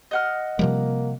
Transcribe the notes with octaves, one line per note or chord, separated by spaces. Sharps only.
D#5 F#5 F6
C3 F3 G3 A#3